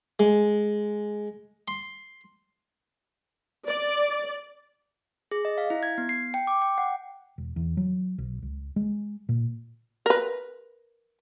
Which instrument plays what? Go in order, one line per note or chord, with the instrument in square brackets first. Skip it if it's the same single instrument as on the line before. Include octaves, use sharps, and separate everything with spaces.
[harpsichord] G#3
C6
[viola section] D5
[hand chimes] G#4
D#5
F5
E4
G#6
B3
C7
G5
D6
G5
F#5
[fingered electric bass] E1
E2
F#3
B1
C#2
G#3
A#2
[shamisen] A#4 B4